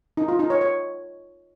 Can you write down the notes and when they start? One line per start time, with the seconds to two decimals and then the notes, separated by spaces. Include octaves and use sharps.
0.17 D#4
0.28 F4
0.39 D#4
0.50 C#5
0.61 C#5